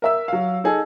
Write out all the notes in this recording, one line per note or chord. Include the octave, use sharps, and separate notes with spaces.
A#4 E5 E6
F#3 F5
D#4 G#4 A4